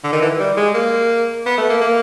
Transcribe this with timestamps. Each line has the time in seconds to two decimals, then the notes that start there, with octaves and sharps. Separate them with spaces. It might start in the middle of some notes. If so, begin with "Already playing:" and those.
0.04 D3
0.13 D#3
0.21 E3
0.39 G3
0.57 G#3
0.74 A#3
1.46 B3
1.58 A3
1.70 A#3
1.81 A#3